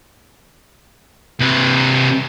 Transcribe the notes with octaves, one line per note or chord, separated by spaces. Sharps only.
C3 B4